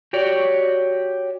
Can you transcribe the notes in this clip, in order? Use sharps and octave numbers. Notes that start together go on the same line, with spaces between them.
F#4 G4 C#5 D5